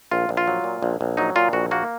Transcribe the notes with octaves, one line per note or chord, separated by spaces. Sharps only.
A#1 F4
A#1
F4
F#3
A#2
A#1
A#1
F#3 D#4
A#2 F4
A#1 F#4
A#3 F#4